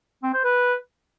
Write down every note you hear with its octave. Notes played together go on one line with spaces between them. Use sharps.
C4
C5
B4